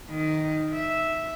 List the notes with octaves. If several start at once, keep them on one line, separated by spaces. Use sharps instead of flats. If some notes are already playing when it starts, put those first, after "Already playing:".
D#3
E5